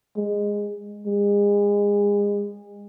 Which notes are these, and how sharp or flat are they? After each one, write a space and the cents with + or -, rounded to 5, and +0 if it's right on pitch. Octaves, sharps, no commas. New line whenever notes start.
G#3 -15
G#3 -30